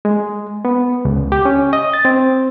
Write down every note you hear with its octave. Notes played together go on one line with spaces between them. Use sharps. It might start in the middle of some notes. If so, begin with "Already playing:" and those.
G#3
B3
C#2
G4
C#4
D#5
A6
C4